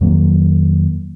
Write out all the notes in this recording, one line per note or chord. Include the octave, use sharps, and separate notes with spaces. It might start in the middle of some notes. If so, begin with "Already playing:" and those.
F2 D#3 F#3 A#3